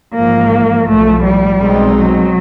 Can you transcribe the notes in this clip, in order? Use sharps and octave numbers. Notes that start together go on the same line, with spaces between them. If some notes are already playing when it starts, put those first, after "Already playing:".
A1 G#2 F3 A#3
B1 A2 F3 A3
G3
B1 B2 G#3 C4 D#4
F#3